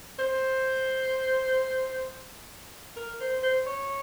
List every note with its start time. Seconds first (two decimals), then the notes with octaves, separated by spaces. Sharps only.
0.19 C5
2.96 A#4
3.20 C5
3.43 C5
3.66 C#5